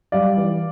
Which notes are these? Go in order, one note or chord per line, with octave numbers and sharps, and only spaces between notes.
G3 D5 F5
E3